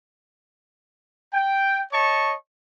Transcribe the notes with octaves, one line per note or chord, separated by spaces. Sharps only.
G5
C#5 D#5 A5 C#6